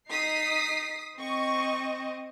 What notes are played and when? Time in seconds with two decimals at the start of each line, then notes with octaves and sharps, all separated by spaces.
0.10 D#4 D#6 B6 C7
1.18 C4 D#5 C#6